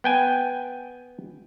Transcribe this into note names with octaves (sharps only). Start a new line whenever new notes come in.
B3 G5 G#5